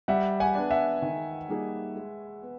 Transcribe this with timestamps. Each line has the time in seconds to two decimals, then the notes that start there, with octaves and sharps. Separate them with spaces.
0.08 G3 E5 F#5
0.40 F#5 G#5
0.55 B3 D4
0.71 E5 F#5
1.02 D#3
1.49 G3 A#3 D#4 G#4
1.96 G#3
2.42 B3